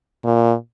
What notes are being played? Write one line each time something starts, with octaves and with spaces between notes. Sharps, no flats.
A#2